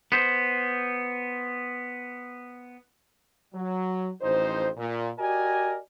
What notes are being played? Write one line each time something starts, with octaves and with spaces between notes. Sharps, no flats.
B3 C5
F#3
A1 F2 D#4 C5
A#2
F#4 G4 A#4 D5 D#5 G#5